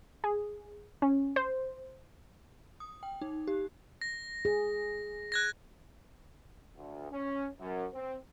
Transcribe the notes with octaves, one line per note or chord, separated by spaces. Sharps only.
G#4
C#4
C5
D#6
G5
D#4
G4
A#6
G#4
F#6 G#6 A#6
D2
C#4
F#2
C4